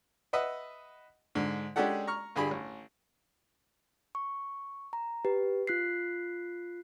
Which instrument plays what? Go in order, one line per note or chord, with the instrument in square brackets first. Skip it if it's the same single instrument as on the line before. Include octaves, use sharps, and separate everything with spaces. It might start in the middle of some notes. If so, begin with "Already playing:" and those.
[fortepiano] B4 D#5 E5 F#5
G#2 D3
G#3 C#4 D4 G4 A4 F#5
A#5 C#6 F6
G2 D3 G3 G#4 B5
A1
[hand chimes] C#6
A#5
G4 B4
F4 F#6 B6 C7